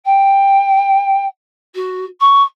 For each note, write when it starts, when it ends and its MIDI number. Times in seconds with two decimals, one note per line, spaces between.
0.05 1.25 79
1.75 2.04 66
2.20 2.42 85